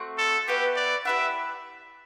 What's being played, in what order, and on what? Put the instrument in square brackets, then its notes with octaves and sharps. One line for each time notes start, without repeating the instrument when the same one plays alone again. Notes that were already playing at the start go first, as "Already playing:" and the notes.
Already playing: [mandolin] A3 C4 F#4
[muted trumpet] A4
[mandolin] B3 F#4 B4 E5 [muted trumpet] G4
[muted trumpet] D5
[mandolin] E4 G4 B4 F#5 [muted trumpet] E5